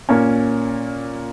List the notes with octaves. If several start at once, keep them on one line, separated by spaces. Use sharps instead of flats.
A#2 A#3 C#4